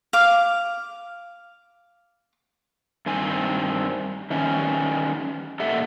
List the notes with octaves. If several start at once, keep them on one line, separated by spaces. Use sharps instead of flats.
F5 D6
G2 D#3 C4 G#5
D#3 E3 G3 C#4
A#2 G4 A4 E5 F#5